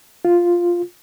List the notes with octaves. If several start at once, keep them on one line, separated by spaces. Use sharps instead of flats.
F4